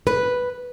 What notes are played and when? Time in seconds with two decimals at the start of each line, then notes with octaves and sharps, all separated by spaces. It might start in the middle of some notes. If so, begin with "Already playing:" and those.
0.07 B4